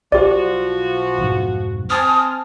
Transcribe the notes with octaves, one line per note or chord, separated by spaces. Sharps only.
B1 F3 F#4 G4 D5
B1 F2 G#2
C4 G#5 A5 D#6 F6